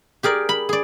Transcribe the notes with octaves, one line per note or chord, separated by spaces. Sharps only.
G4 G#4 A#4 D5
B5
G#4 D5